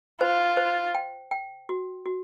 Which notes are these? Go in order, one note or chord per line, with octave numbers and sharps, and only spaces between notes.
F4 C5
C5
G5
G5
F#4
F#4